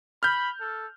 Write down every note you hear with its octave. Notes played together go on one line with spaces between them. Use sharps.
B5 F6 G6
A4